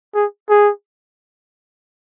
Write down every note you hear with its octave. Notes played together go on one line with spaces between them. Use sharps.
G#4
G#4